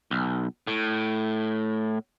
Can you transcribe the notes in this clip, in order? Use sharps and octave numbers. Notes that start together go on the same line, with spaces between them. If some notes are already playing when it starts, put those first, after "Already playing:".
B1
A2